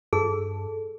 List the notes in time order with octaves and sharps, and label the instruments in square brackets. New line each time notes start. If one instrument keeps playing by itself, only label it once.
[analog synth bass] G2 [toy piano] G#4 [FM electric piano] A4